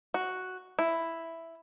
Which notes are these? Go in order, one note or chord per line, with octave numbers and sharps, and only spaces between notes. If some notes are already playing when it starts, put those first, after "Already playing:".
F#4
E4